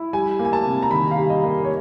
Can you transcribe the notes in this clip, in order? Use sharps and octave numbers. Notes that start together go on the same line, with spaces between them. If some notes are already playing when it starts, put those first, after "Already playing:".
Already playing: E4
G3 G#5
A#3
G#5
A5
C3
A#5
D#3 B5
F5
G3
D#5
A#3
C#5